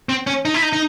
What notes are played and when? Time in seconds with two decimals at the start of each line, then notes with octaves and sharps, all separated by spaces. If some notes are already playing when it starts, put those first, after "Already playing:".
0.09 C4
0.27 C#4
0.45 D#4
0.54 E4
0.62 D#4
0.73 D#4